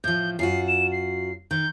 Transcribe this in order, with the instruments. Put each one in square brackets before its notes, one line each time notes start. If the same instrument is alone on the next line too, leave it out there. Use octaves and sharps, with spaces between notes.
[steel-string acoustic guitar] A2 F3 [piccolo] G6
[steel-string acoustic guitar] F#2 F4 F#4 [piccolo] C7
[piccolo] E7
C7
[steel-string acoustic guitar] D#3 [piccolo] G6